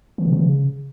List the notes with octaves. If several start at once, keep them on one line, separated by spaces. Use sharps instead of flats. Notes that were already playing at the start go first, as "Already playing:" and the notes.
E3
C#3
E3
C#3